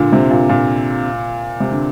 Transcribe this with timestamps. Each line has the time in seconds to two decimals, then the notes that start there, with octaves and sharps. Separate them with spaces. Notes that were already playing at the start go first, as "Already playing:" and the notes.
Already playing: A#2 D3
0.12 C3
0.31 A#2
0.49 A#2
1.60 C3
1.71 D3